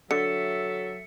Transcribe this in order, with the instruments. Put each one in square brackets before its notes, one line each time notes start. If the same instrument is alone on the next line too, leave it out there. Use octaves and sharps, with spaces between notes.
[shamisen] D3 [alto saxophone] F#3 [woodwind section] A4 E5 [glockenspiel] C#7